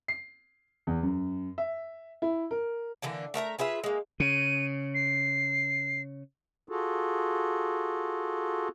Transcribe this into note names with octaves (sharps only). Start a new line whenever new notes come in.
C7
E2
F#2
E5
E4
A#4
D3 E3 A#3 D4
A3 A#4 E5 A#5
F4 G#4 B4 E5
G#3 A#3
C#3 D#7
C7
F4 F#4 G#4 A4